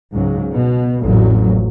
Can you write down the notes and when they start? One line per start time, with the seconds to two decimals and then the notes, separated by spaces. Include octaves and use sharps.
0.12 C#2 G#2 C#3 F#3
0.52 B2
1.02 A1 F2 A#2 F#3